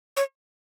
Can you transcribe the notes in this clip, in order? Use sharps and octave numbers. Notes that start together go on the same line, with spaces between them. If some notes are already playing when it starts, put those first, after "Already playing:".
C#5